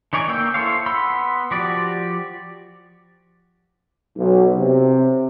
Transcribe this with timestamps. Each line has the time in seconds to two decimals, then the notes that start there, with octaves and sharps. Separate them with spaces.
0.13 E3 D#4 C#5 D5 G#5
0.28 A#3 G5 E6 G6
0.54 E4 A4 C5 C#5 F5
0.86 B3 B5 C6 E6
1.51 F3 F#4 G4 D5
4.17 B1
4.56 C3